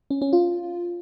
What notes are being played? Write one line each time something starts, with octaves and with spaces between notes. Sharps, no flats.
C#4
C#4
F4